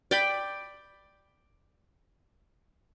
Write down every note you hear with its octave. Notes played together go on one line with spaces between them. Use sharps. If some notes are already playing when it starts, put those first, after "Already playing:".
D5 G5 B5